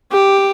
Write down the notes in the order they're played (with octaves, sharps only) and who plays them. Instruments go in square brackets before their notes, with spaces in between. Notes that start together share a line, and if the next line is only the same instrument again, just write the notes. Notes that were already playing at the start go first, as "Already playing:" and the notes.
[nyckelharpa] G4